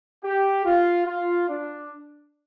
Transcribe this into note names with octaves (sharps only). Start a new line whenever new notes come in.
G4
F4
F4
D4